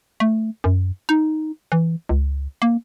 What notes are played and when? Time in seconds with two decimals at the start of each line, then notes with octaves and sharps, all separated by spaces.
0.20 A3
0.64 F#2
1.09 D#4
1.72 E3
2.09 C#2
2.62 A#3